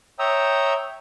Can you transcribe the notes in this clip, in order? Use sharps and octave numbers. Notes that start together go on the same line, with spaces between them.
C#5 E5 G5 A#5 D#6 E6